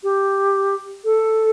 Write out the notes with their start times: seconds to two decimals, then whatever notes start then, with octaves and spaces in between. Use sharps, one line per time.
0.03 G4
1.04 A4